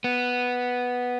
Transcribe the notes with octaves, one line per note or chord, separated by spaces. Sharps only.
B3